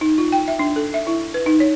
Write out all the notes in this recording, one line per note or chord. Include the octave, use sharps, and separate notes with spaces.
D#4
F4
G5
E5
D4
A4
E5
E4
B4
D#4
C#5